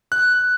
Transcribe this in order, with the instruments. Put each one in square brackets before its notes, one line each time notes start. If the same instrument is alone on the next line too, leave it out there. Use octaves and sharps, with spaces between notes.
[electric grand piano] F#6